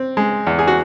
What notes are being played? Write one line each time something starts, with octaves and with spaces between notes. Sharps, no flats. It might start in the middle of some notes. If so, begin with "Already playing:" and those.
Already playing: C4
G#3
E2
G#4
F#4